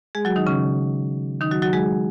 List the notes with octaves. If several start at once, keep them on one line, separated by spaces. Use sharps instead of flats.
G#3 G#4
F#3 F#4
D#3 D#4
C#3 C#4
D#3 D#4
F#3 F#4
F#3 F#4
G#3 G#4